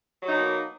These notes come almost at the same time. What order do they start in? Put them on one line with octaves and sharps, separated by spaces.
F#3 D#4 B2 A#3